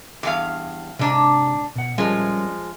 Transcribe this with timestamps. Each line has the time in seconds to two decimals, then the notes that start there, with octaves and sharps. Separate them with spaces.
0.23 E2 G2 F5
0.99 G#2 C3 D4 A#5
1.75 B2 F#5
1.98 F3 G3 G#3 C#4 A#4